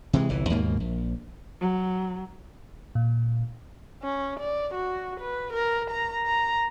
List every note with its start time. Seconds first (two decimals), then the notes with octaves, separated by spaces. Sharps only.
0.13 C3 E3 G#3
0.29 G1 C2 E3
0.50 D#2 G#2 B2 A#3
0.80 A#1
1.60 F#3
2.95 A#2
4.03 C#4
4.40 D5
4.74 F#4
5.20 B4
5.53 A#4
5.90 A#5
6.25 A#5